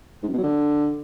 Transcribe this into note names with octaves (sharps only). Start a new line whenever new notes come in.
G#2
F#2
B2
F#3
D3